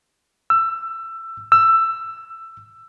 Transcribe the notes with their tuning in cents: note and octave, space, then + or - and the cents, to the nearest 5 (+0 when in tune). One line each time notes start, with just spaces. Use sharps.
E6 +20
E6 +15